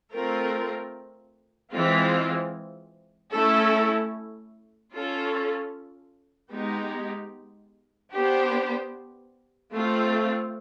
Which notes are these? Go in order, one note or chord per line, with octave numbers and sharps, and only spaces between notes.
A3 C4 F4 A#4
E3 G#3 C4 F4
A3 C#4 E4 A4
C#4 F4 A4
G#3 B3 D#4 G4
B3 D4 G4 C5
A3 C4 F4